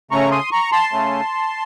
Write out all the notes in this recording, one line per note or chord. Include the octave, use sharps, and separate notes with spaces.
C#3 A3 C#4 A#5 C#6
C6 D#6
A#5 C#6
A5 C6
C#3 A3 C#4